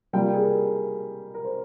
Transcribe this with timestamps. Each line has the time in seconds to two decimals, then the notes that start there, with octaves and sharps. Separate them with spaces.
0.13 C3 G3 A#3 F4 G5
0.33 G#4
0.44 A#4
1.34 A#4
1.45 C5